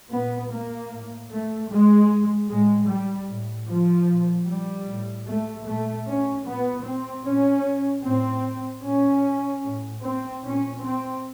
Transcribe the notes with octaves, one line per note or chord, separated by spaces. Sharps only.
A#2 B3
A#3
A2
A3
A2 G#3
A2 G#3
G3
A2
F3
A#2
G3
A2
A3
A#2 A3
C#4
A#2 B3
C4
A#2 C#4
A2 C4
A#2 C#4
A2
C4
A#2 C#4
C4